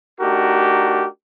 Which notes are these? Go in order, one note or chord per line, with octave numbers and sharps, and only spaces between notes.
A3 D4 D#4 F#4 G4 A#4